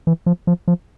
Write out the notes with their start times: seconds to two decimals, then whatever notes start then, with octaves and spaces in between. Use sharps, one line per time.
0.07 E3
0.26 F3
0.47 F3
0.68 F3